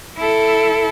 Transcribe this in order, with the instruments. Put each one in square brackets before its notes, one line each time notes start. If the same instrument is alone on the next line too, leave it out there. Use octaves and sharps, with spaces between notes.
[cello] E4 A4